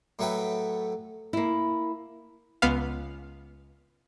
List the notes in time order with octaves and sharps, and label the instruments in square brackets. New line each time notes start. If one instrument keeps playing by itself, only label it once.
[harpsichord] A2 F#3 A3 B4 G5
[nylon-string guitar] A#3 E4
[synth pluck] C#2 B3 F5